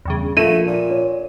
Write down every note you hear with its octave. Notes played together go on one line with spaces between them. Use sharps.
E2 G2 C#3
A#1 A3 A#3 D#7 E7
A#2
C#5